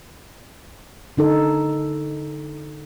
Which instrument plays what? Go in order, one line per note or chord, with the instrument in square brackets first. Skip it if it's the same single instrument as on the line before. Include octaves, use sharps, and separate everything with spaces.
[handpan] D3 D#4 A4